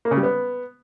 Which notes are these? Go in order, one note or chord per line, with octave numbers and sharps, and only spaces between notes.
A#3
C#3
G3
B3